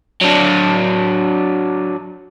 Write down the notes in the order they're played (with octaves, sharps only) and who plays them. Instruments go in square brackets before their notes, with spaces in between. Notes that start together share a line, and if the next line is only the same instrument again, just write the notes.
[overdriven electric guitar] F#3 D4